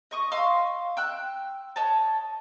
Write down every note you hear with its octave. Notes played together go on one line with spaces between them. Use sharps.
D#5 C#6 D#6
D#5 F5 C6 E6
G5 E6 F#6
C#5 D#5 A5